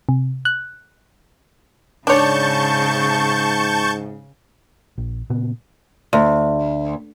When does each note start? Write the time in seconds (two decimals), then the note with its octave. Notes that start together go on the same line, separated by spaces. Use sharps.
0.09 C3
0.45 F#6
2.07 G#2 C#3 D4 C#5 A5 C#6 G6
4.98 A#1
5.30 A#2 C#3 B3
6.13 D2